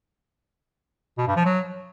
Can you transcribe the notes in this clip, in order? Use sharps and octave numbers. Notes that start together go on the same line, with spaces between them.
B2
G2
F3
F#3